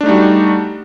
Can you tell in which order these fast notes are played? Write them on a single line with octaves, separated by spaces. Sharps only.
D4 A3 D#4 G3 F#4